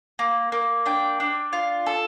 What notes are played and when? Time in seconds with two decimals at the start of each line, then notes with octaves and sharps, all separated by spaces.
0.19 A#3
0.52 A#3
0.86 D4 G5
1.20 D4
1.53 F4
1.86 A4